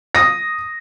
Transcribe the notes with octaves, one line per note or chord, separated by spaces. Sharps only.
D#6 A#6